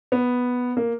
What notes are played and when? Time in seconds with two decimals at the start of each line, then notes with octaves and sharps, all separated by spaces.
0.12 B3
0.77 A#3